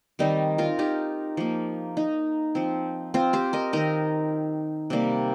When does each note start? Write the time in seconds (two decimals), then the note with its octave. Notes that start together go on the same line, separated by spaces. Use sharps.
0.19 D#3 G3 C4 D#4
0.58 F4 A#4
0.79 D#4 G4
1.37 F3 A#3
1.97 D#4
2.55 F3 C4
3.14 C4 F4
3.33 G4 C5
3.53 A#4 D#5
3.73 D#3 C4 A#4 D#5
4.90 C3 G3 A#3